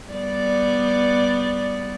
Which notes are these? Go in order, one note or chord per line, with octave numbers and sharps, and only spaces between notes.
G3 B3 D5